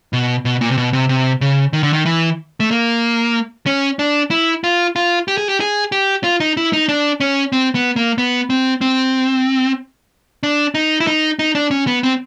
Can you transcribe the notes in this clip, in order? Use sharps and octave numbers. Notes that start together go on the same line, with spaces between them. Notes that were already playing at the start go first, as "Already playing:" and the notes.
B2
B2
A#2
C3
B2
C3
C3
C#3
D#3
D3
D#3
E3
A3
A#3
C#4
D4
E4
F4
F4
G4
G#4
G4
G#4
G4
F4
D#4
E4
D#4
D4
C#4
C4
B3
A#3
B3
C4
C4
D4
D#4
E4
D#4
D#4
D4
C#4
B3
C4